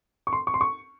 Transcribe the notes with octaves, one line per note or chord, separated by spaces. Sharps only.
C#6
C6
C#6
C6
C#6